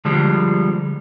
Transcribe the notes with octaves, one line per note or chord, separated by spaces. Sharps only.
D3 F3 G3 G#3